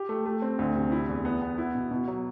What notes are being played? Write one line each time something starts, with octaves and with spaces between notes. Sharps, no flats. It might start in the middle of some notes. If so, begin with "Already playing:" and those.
Already playing: G4
A3
A3
C4
D2
C3
E4
E2
B3
B3
E4
B2
B2
F#3